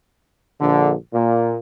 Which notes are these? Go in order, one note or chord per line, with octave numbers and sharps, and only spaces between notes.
A#1 D3
A#2